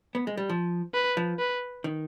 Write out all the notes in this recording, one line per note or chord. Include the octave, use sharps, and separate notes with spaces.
B3
G#3
G3
F3
B4
F3
B4
D#3